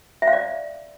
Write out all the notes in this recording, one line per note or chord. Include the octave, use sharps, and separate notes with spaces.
E5
F5
D5